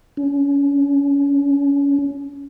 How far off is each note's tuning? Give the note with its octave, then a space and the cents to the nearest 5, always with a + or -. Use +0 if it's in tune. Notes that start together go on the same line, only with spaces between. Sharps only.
C#4 +25